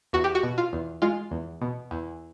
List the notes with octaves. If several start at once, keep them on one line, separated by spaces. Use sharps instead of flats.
E2 F#4
G4
F#4
B2
F4
E2
G#3 F4
E2
B2
E2